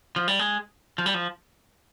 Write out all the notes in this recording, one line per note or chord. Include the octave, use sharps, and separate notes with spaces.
F3
G3
G#3
F3
G3
F3